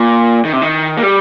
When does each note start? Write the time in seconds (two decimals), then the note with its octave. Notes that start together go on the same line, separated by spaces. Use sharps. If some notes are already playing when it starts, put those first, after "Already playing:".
Already playing: A#2
0.45 D#3
0.53 C3
0.62 D#3
0.97 A#3
1.03 G3